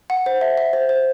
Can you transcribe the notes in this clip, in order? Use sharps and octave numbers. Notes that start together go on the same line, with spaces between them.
F#5
C5
E5
E5
C5
C5